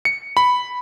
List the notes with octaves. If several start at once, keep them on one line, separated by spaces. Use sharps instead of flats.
C#7
B5